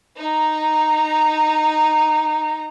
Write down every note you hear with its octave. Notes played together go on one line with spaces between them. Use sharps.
D#4 A#5